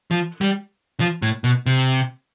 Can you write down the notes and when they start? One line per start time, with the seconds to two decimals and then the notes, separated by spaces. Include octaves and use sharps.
0.11 F3
0.41 G3
1.00 F3
1.22 A2
1.44 B2
1.66 C3